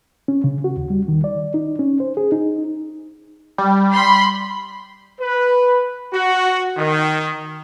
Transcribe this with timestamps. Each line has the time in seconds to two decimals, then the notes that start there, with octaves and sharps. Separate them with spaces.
0.28 C#4
0.44 C#3
0.64 F#4
0.76 D#2
0.90 G3
1.08 D#3
1.24 D5
1.54 D#4
1.79 C#4
2.00 C5
2.17 G#4
2.32 D#4
3.58 G3
3.90 B5 C6
5.20 B4
6.13 F#4
6.78 D#3